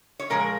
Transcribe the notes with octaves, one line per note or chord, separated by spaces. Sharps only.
C#5
A#2 F3 G#3 A#4